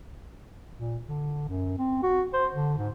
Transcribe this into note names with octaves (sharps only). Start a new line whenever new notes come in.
A#2
D3
F#2
C4
F#4
C5
D3
G#2